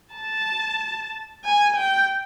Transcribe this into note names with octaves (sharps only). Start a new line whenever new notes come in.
A5
G#5
G5